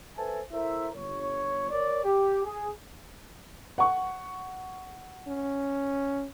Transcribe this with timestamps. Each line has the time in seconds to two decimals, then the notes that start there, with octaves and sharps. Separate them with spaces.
0.17 A4 B4 C5 E5 G#5 A5
0.52 E4 A4 A#4 C5 E5
0.95 G1 C#5
1.70 A#4 C#5 D5
2.04 G4
2.44 G#4
3.78 F#5 C#6
5.28 C#4